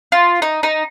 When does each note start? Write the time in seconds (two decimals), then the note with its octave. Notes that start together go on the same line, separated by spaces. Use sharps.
0.12 F4
0.42 D#4
0.63 D#4